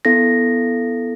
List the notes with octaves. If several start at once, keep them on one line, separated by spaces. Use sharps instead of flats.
B3 E4 A4 A#6